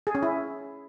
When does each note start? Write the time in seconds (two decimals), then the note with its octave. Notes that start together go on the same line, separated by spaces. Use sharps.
0.07 G#4
0.15 C#4
0.23 E4